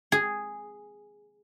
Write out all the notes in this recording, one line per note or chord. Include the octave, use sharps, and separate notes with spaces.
G#4